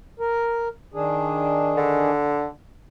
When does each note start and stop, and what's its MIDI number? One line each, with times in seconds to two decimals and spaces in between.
0.20 0.68 70
0.94 2.11 51
0.94 2.11 62
0.94 2.11 68
1.77 2.48 50